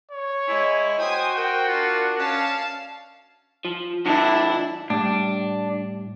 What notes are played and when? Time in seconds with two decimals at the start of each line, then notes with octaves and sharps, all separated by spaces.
0.11 C#5
0.48 G#3 E4 G#5
0.99 F#4 C5 G5 G#5 D#6
1.35 A#4 G5
1.68 D4 F4
2.19 C#4 F5 A5
3.65 F3
4.06 D3 F3 D4 E4
4.90 A2 G3 D4